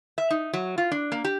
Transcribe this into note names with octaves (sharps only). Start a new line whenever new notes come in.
E5
D#4
F#3
F4
D4
A#3
G4